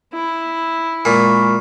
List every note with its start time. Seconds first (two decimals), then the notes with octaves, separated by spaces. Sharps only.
0.14 E4
1.05 A#2 G#3 B5 C#6